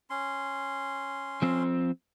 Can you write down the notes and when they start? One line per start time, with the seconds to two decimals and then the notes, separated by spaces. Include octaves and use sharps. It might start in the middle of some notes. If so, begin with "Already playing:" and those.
0.10 C#4 C6
1.42 F3 C4